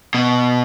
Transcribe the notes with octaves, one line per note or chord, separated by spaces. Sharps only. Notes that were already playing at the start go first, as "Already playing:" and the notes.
B2